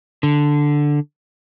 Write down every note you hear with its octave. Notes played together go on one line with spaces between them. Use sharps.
D3